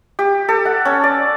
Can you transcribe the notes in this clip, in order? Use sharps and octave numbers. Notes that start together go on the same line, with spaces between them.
G4
A4
F#5
C#4
D5